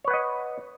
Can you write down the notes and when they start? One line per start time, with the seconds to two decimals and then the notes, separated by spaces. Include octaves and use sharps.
0.04 C#5
0.08 B4
0.11 F#5
0.14 D#5